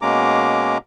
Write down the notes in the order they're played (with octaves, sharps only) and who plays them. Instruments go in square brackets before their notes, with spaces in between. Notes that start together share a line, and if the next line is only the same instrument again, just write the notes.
[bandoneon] B2 G#3 A#3 C#4 A#5 D6